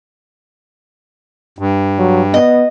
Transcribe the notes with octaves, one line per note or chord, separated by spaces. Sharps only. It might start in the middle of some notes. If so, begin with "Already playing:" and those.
G2
F#3
B3 D#5